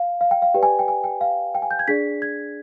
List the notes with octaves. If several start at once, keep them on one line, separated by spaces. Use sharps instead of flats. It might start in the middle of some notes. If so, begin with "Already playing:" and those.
Already playing: F5
F5
G5
F5
G4 B4 D5 G5
G#5
G5
G#5
G5
F5
G5
G#5
G6
G#6
D4 G#4 D5 B6
G#6